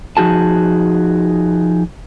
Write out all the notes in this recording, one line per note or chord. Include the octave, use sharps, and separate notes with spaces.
F3 D#4 F#4 G#4 A5